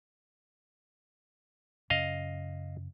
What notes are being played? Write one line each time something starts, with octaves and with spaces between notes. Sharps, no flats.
F#2 C#3 C#4 D#5 F5